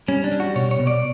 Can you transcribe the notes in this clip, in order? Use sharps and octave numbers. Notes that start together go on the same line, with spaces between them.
G3 C#4
D4
G3
F#4
B2 C#5
C#5
B2
D5